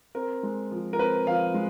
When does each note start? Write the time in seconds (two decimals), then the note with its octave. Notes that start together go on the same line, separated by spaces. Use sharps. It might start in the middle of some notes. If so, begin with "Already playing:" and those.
0.15 C4 A#4
0.43 G#3
0.71 F3
0.93 A#4
0.99 C4 B4
1.27 F3 F5
1.54 G#3